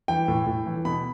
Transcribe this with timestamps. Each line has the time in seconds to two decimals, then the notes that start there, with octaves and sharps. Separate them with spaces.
0.08 E3 G5
0.28 A2
0.46 A2
0.66 E3
0.85 B2 B5